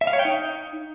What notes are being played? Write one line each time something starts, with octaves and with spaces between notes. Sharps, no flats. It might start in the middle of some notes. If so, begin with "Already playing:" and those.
E5
F5
C#5
G5
D#4